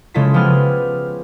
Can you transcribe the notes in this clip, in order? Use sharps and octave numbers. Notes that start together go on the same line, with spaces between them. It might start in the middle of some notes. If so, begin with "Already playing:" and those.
C#3 G#3 E4 F4 A4 B6
F3 B3 G4 G#4 B5 F6